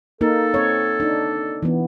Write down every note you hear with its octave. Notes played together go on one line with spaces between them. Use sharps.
A#3 D#4 A4 A#4
C4 C#5
D4 D#4
E3 B3